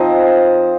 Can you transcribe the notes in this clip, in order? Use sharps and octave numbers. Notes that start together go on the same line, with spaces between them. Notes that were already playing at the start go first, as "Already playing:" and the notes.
Already playing: F3 C4 D#4 C5 D#5